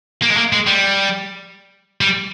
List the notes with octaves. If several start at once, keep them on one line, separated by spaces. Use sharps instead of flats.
A#3
G#3
A#3
G#3
G3
G3